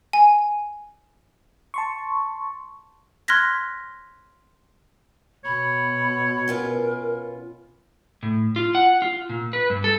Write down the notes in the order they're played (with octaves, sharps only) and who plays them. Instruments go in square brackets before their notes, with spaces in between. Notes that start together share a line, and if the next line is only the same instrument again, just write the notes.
[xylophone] G#5
[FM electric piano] A5 C6 C#6
[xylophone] C6 F6 F#6 G#6 A#6 B6
[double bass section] B2 [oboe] C#5 [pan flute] B5
[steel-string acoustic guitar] C#4 F4 B4 [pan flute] A#4
[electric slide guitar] A2
F4
F#5
F4
A#2
B4
G2
A4